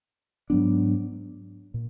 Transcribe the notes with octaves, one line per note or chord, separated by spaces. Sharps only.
G#2 F#3 B3 D4
A#2